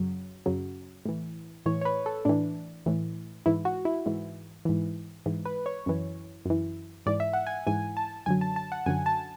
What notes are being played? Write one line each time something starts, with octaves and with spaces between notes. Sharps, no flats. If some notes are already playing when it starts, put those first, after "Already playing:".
Already playing: F#2 C#3 F#3
F#2 C#3 F#3
A2 E3
A2 E3 C#5
C#5
B4
A4
A2 E3 D4
A2 E3
G#2 E3 E4
F#4
E4
G#2 E3
G#2 E3
G#2 E3
B4
C#5
F#2 E3
F#2 E3
G#2 E3 D5
E5
F#5
G#5
G#2 E3 G#5
A5
F#2 D3 F#3 G#5
A5
A5
F#5
F#2 D3 F#3 G#5
A5